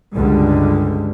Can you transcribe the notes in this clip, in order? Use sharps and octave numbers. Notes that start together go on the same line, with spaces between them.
C#2 G2 D3 G3 G#3